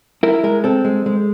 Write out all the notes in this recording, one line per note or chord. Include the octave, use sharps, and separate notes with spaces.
E4 A#4
G#3 A#4
C4 A4
G#3
G#3